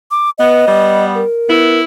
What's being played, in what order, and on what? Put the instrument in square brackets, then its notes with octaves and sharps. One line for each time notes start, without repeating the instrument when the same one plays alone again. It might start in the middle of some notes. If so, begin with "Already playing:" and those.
[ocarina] D6
[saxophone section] B3 [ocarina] D#5
[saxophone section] G3 B3
[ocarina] A#4
[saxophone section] B3 E4